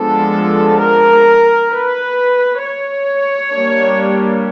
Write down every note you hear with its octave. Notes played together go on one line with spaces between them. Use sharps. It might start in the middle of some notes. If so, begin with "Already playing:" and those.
Already playing: F3 G#3 B3 D4 A4
A#4
B4
C#5
G3 A#3 D4